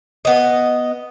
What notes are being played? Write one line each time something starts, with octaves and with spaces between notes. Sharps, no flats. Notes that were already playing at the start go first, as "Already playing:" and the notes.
B3 D#5